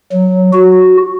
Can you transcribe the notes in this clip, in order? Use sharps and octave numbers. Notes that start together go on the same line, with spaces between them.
F#3
F#4